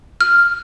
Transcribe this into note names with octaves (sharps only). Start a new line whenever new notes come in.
F6